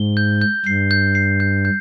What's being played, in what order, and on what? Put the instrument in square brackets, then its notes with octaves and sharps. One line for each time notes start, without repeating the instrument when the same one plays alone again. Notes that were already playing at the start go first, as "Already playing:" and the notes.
Already playing: [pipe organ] G#2 [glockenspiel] G7
[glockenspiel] G6
G6
[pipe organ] G2 [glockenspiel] C7
[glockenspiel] G6
C7
G6
G6